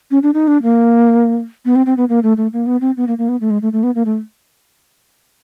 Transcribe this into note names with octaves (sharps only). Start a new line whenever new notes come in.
C#4
D4
D#4
D4
A#3
B3
C4
C4
B3
A#3
A3
A3
A#3
B3
C4
B3
A#3
A#3
B3
A3
G#3
A3
A3
B3
A#3
A3